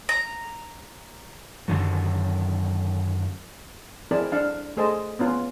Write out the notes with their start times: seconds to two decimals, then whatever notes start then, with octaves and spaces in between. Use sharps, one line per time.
0.09 A#5
1.68 F#2 D3 D#3 F#3
4.11 C4 E4 G#4 A#4 D5 A5
4.32 D4 F5 A5
4.77 A3 G#4 C5 D#5 A5
5.19 B3 C#4 F4